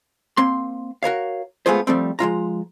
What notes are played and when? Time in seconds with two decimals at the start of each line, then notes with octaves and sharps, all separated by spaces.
0.37 A#3 C4 C6
1.03 F#4 A#4 C#5 F5
1.66 G#3 A3 B3 F4 G#4 C5
1.87 F3 G3 A3 C4
2.19 F3 G#3 F4 A#5